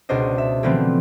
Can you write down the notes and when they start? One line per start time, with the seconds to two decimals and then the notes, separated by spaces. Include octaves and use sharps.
0.09 C#2 B2 D4 C5 D#5
0.38 E5
0.63 D3 E3 F3 A3 B3 C4